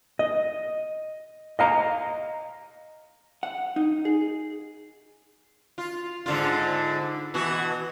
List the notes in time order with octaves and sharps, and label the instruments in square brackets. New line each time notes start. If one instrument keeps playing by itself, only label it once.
[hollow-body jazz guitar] D#5
D#5 F5 A#5
F#5
D#4
G#4
[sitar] F4
G#2 D3 F4
B2 E3 F#4